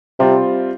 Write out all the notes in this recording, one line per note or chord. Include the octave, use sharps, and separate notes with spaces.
C3 G3 C4 F4